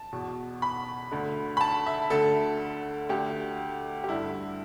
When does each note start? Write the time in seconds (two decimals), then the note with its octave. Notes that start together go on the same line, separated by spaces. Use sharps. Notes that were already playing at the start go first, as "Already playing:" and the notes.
Already playing: A5
0.13 E2 B2
0.62 B5
1.11 D2 D3
1.57 B5
1.61 A5
1.87 E5
2.10 D2 D3 A4
3.09 D2 D3 G4
4.04 G4
4.09 G2 D3 E4